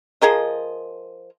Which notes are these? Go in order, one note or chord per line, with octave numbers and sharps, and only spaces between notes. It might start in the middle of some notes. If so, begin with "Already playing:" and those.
F3 G#4 A#4 D#5